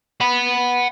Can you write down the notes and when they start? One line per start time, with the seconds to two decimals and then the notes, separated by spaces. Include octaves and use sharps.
0.21 F#5 B5